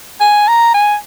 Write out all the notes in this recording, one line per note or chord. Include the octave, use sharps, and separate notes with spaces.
G#5
A#5
G#5